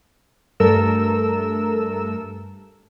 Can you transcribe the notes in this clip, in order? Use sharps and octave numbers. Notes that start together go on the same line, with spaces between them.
G2 A3 A4 A#4 E6